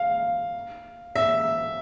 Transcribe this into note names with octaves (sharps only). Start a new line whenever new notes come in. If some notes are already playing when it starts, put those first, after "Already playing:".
Already playing: F5
E5